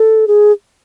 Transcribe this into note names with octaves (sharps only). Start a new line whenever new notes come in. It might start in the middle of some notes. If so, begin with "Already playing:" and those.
Already playing: A4
G#4